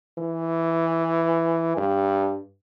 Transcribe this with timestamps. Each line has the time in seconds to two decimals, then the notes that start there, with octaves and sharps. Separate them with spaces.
0.18 E3
1.77 G2